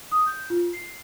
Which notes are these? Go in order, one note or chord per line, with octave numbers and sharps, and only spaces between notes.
D#6
G6
F4
C7